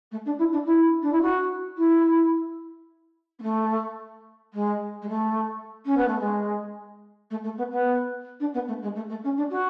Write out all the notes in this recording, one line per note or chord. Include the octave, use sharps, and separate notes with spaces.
A3
D4
E4
D4
E4
D4
E4
F#4
E4
B3
A3
G#3
G#3
A3
C#4
B3
A3
G#3
A3
A3
B3
B3
D4
B3
A3
G#3
A3
A3
C#4
D4
F#4